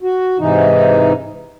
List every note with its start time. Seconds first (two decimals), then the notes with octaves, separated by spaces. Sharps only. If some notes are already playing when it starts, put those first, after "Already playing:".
0.02 F#4
0.40 G#2 C3 E3 D#4